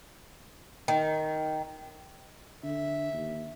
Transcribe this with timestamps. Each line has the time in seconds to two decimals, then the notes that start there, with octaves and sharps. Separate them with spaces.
0.88 D#3
2.63 D3 E5
3.13 D#2